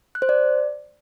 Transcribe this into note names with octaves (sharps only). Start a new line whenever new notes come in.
F#6
C5
D5